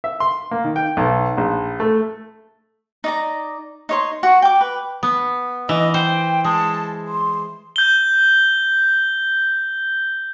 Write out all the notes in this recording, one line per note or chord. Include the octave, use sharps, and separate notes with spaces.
E5
C6
A#3
D#3
G5
B1
A#1
A3
D#4 D5 A#5
D#4 C#5 C6
F#4 C#6
G5 D6
B4
B3
E3 D#5
C5 G5
G#3 A5
C6
G6 G7